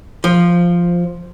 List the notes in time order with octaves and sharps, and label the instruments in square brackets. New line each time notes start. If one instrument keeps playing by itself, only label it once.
[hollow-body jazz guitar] F3